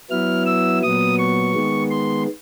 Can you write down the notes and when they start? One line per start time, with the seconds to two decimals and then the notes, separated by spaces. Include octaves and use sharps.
0.10 F#3 B3 E4 F6
0.46 E6
0.83 A#2 F#3 B3 D#6
1.19 C#6
1.55 D#3 G#3 B3
1.91 C6